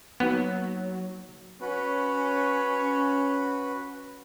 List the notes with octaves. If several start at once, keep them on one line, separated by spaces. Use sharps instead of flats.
F#3 A#3 B3 D#4 F#4
C#4 F#4 B4